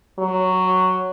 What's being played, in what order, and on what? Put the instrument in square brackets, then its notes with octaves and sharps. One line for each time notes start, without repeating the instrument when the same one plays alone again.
[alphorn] F#3